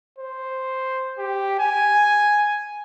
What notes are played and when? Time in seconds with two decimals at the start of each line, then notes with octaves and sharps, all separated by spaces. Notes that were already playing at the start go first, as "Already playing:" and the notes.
0.19 C5
1.18 G4
1.59 G#5